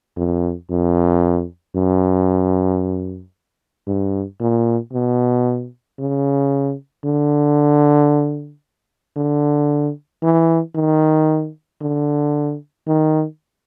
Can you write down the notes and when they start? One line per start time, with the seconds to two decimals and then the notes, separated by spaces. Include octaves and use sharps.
0.16 F2
0.70 F2
1.75 F#2
3.87 G2
4.40 A#2
4.93 B2
5.99 C#3
7.05 D3
9.17 D3
10.23 E3
10.75 D#3
11.81 D3
12.87 D#3